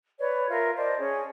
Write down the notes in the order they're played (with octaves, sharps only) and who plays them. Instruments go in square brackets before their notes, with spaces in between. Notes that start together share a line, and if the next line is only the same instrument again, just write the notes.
[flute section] B4 C#5 D5
F4 A#4 E5
C5 D5 D#5 A5
C#4 G#4